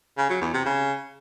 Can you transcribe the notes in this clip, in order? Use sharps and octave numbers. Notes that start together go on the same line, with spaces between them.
C#3
F#3
E2
C3
C#3